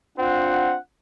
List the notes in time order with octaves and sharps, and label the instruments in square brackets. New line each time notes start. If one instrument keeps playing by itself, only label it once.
[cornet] C4 [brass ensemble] D4 F4 F#5